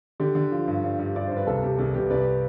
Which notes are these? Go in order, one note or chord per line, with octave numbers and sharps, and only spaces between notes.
D3 G4
D3
F3
G2
G2
G2
G2 D5
G2 C5
B4
C2 A4
C2 G4
C2 A4
C2 G4 B4
C2 B4 D5